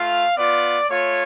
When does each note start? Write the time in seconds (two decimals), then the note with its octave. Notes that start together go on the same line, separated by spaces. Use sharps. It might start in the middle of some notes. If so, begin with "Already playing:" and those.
Already playing: A3 F4 F5
0.37 B3 F4 D5
0.90 A3 F4 C#5